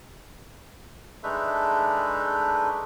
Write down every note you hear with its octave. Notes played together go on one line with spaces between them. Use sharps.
G#3 A3 D4 D#4 B4 E5